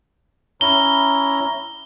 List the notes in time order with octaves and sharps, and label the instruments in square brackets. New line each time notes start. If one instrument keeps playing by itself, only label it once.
[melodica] C#4 E4 A#5 [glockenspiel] G7